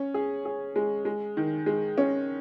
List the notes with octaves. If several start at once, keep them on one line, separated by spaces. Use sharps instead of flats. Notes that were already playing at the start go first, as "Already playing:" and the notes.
Already playing: C#4
G#4
G#4
G#3
G#3
D#3
G#3
C#4